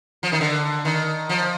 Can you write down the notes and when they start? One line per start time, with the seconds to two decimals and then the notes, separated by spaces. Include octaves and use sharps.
0.23 F3
0.32 D#3
0.41 D3
0.85 D#3
1.29 F3